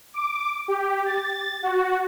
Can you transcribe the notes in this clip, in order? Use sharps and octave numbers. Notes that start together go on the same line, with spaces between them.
D6
G4
A6
F#4